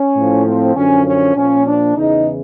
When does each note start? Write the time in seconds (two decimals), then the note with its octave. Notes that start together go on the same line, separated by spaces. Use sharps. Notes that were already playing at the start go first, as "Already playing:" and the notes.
Already playing: C#4
0.16 A2 F3
0.46 C4
0.76 F#2 D3 F3 C#4
1.07 C#4
1.37 A#2 F3 C#4
1.67 D4
1.97 E2 C#3 E3 D#4